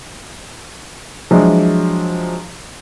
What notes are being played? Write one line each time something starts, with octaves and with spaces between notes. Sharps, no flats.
F3 F#3 G#3 D4 E4